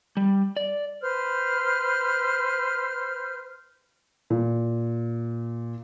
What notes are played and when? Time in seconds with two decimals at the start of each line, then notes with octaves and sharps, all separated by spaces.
0.17 G3
0.56 D5
1.01 B4 C5 F6
4.30 A#2